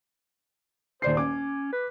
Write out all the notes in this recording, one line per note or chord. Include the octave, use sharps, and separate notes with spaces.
D#1 C5 D5 C7
C#4 D6
B4